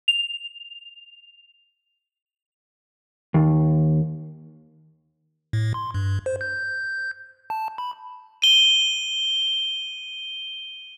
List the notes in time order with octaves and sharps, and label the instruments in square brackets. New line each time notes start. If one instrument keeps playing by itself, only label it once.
[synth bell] F7
[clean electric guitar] D#2
[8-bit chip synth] A2
C6
G2
C5
G6
A5
B5
[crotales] D#7 G7